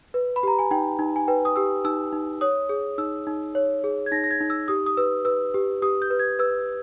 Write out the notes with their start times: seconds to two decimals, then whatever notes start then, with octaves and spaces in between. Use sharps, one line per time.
0.14 B4
0.36 B5
0.43 G4 A#5
0.59 G#5
0.71 D#4 G5
0.99 D#4
1.16 G#5
1.28 B4 G5
1.45 D#6
1.56 G4 E6
1.85 D#4 E6
2.12 D#4
2.41 C#5 D#6
2.69 G#4
2.98 D#4 E6
3.27 D#4
3.55 C#5
3.84 G#4
4.06 G#6
4.12 D#4 A#6
4.24 A#6
4.31 G#6
4.40 D#4
4.50 E6
4.68 G4 D#6
4.86 D#6
4.97 B4 E6
5.25 B4 E6
5.54 G4
5.82 G4 D#6
6.02 G6
6.10 B4
6.19 G#6
6.39 B4 E6